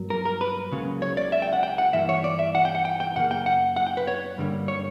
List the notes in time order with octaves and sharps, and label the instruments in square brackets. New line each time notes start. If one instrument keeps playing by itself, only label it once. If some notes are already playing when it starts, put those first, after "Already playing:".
Already playing: [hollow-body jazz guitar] G2 F#3 A#3
A#4
A#4
B4
C#2 C#3 F#3 A#3
C#5
D5
E5
G5
F#5
G5
F#5
G2 E3 A#3 E5
C#5
D5
E5
F#5
G5
F#5
G5
G5
F#2 C#3 A#3 F#5
G5
F#5
F#5
G5
B4
C#5
G2 D3 G3 A#3
C#5